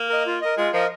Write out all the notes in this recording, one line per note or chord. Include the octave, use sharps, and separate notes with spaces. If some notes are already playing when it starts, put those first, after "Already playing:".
Already playing: A#3
A#4 D#5
F4
A#4 D#5
G#3 F4
F3 A#4 D#5